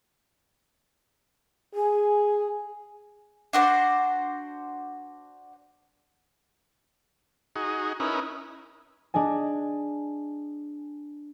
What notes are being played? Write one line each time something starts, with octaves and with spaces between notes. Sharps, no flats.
G#4 G#5
D4 F#4 C5
D#4 F#4 G#4
C#4 D#4 E4 A#4 B4
D4 G#4 D#5 G#5